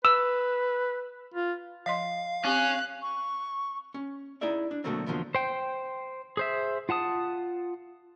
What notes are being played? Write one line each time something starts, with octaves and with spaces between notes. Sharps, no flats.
B4 E6
F4
F3 D#5 F5 C6
C4 C#4 G4 F#6
C#6
C#4
D#4 E4 G#4 D5 E5
D4
B2 D3 F#3 A3 A#3 C4
E2 B2 D3 F3 A#3
C5 G5
G#4 C5 E5
F4 F#5 A5 D#6